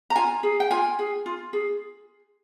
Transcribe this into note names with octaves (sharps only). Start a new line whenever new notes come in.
A#5
F4 G#5
G#4
G5
F4 G#5
G#4
F4
G#4